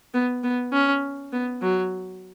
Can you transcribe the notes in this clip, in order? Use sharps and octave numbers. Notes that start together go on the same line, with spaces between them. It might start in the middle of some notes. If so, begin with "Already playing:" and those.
B3
B3
C#4
B3
F#3